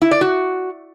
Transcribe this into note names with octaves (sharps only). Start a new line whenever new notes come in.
E4
D5
F#4